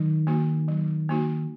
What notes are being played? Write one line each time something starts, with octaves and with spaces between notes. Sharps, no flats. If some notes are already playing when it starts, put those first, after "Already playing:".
Already playing: D#3 F#3
A#3 D#4 F#4
F#3
A#3 D#4 F#4